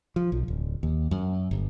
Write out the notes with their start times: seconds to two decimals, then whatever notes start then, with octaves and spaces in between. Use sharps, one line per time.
0.16 F3
0.32 B1
0.48 D1
0.83 D#2
1.11 F#2
1.51 G1